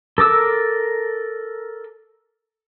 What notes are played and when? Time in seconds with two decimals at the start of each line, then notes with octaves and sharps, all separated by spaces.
0.18 A4 A#4 D6 E6